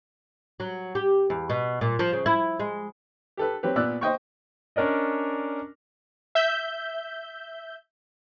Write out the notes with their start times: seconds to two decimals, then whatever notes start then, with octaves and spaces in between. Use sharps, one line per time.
0.60 F#3
0.95 G4
1.30 E2
1.50 B2
1.81 A#2
1.99 F3
2.13 C#3
2.26 E4
2.59 G#3
3.37 G4 A4 B4
3.63 F#3 C4 G4 B4
3.76 A#2 B3 D5 E6 F#6
4.01 C5 D#5 G5 C#6
4.76 C#4 D4 A#4 D5 D#5
6.35 E5 G6